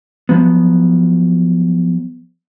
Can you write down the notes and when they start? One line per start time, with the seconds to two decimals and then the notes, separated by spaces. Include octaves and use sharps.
0.29 F3 F#3 B3